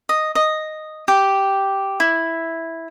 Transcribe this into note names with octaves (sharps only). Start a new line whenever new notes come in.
D#5
D#5
G4
E4